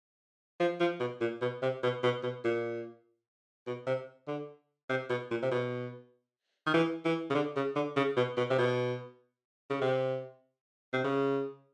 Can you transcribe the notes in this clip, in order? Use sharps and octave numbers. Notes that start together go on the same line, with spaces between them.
F3
F3
B2
A#2
B2
C3
B2
B2
B2
A#2
B2
C3
D3
C3
B2
A#2
C3
B2
D#3
E3
E3
C#3
D3
C#3
D3
C#3
B2
B2
C3
B2
C#3
C3
C3
C#3